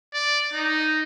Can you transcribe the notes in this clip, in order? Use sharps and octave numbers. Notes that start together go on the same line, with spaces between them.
D5
D#4